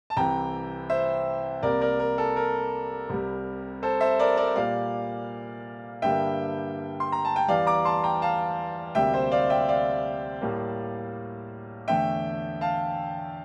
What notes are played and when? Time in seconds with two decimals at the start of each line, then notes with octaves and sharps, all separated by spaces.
0.10 A5
0.17 C2 C3 E3 G5 A#5
0.90 C5 E5
1.63 C2 C3 G3 A#3 A#4 D5
1.81 A#4 D5
1.99 A#4
2.18 A4
2.36 A#4
3.10 C2 C3 G3
3.83 A4 C5
4.01 C5 E5
4.19 A#4 D5
4.37 A#4 D5
4.55 A#2 G3 A#3 D5 F5
6.02 G2 D3 G3 A#3 E5 G5
7.00 C6
7.12 A#5
7.25 A5
7.36 G5
7.48 E2 E3 G3 D5 F5
7.67 A#5 D6
7.85 A5 C6
8.04 G5 A#5
8.22 F5 A5
8.95 D2 C3 G3 A#3 E5 G5
9.13 C5 E5
9.31 D5 F5
9.50 E5 G5
9.68 D5 F5
10.41 A2 G3 A#3
11.88 E2 D3 A3 E5 G5
12.61 F5 A5